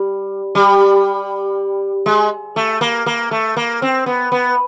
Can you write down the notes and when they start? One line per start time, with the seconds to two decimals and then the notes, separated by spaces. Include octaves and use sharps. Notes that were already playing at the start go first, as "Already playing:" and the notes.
Already playing: G3
0.55 G3
2.06 G#3
2.56 A3
2.81 A#3
3.06 A#3
3.31 A3
3.56 A#3
3.82 C4
4.06 B3
4.32 B3